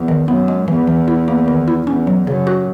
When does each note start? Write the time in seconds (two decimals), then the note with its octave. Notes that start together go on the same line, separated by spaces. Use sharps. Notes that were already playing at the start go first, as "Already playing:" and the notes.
Already playing: E2
0.08 D#3
0.28 F#2 B3
0.48 G#3
0.68 E2 E3
0.87 E3
1.08 E4
1.28 A#3
1.48 D#3
1.68 E4
1.87 E2 C#4
2.07 F#3
2.27 F#2 C#3
2.47 F#4